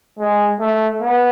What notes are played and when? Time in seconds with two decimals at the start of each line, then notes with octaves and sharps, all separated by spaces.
0.19 G#3
0.60 A3
1.01 B3